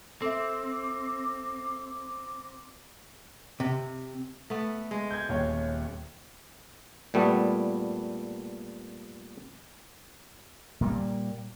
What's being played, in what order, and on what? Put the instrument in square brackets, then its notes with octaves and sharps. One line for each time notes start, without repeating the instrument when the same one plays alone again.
[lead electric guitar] C4 [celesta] A4 E5 [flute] D6
[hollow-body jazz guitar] C3
[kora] A3 B3
G#3
[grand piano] G6 G#6
D#1 D#2 C#5
[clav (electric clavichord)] A#2 G3 A3 B3
[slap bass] A#2 G3 A#3